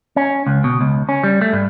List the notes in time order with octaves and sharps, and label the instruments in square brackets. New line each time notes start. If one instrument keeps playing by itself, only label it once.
[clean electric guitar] C#4
C#2
B2
C#2
C#4
G3
A3
G2